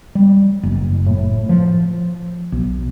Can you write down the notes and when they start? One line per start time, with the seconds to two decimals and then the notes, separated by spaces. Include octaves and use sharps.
0.15 G3
0.63 F#1
1.06 A2
1.49 F3
2.52 B1